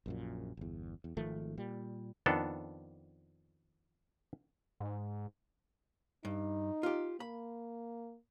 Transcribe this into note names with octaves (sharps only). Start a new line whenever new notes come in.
A#1 F#2 A#2
G1 E2
E2
G#1 D#3 F3 A3
A#2 G3
F2 D#3 B3 D4 A4
G#2
G2 D#4
F4 G4
A#3 B5